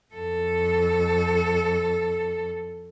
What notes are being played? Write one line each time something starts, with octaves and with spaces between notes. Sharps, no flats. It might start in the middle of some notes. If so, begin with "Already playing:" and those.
F2 A4